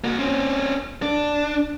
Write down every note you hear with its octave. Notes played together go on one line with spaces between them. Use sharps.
A#3 F#4
C4 C#4
D4